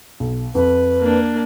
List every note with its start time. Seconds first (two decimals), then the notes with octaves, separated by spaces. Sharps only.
0.20 B1
0.55 F2 B4
1.01 A#3 D4